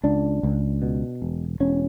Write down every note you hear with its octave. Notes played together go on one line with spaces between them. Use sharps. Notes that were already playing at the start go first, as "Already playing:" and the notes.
C#2 D4
C#2
B2
E1
E1 C#4